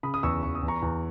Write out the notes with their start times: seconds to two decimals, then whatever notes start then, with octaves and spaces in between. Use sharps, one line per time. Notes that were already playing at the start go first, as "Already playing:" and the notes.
0.03 C#3 B5 D#6
0.14 D#6
0.23 E2 C#6 E6
0.43 E2 C#6
0.55 D#6
0.63 E2
0.68 A#5 C#6
0.82 E2